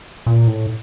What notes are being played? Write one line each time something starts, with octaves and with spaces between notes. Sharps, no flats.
A#2
A2